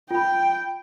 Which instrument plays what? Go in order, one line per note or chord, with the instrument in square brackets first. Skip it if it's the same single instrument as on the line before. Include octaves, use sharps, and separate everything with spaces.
[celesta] F4 B5 [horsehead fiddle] G5